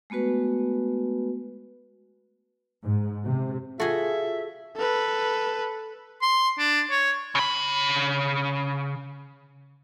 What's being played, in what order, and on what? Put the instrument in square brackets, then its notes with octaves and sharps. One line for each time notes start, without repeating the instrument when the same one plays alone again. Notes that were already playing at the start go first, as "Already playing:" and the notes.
[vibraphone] G#3 A3 B3 F#4 B4
[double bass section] G#2
C3
[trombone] F4 [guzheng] F#4 G#4 [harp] A4 [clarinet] E5
[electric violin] A4 B4
[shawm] C6
D4
C#5
[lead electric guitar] C#3 B5